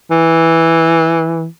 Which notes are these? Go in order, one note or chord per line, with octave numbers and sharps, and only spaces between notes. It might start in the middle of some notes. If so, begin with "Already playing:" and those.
E3